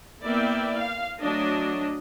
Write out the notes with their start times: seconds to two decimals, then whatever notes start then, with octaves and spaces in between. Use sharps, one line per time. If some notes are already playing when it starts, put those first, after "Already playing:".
0.23 A#3 B3 E4 D5 E5 G5
0.75 F5
1.19 F#3 A3 D4 D#5